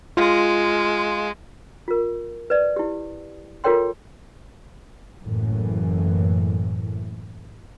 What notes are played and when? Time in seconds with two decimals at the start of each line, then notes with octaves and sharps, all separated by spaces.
0.17 G#3 F4
1.88 F4 A#4
2.50 B4 D5
2.76 E4 G4
3.64 F4 A4 A#4 C#5 G5 C6
5.21 F#1 F#2 A2 E3